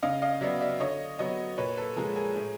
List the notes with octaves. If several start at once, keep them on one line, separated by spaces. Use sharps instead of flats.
C#3 D#5 F5
D#5 F5
F#3 B3 D5 E5
D5 E5
D3 C#5 D#5
F#3 B3 C#5 D#5
A#2 B4 C#5
A4 B4
F3 G#3 G#4 A#4
G#4 A#4
A2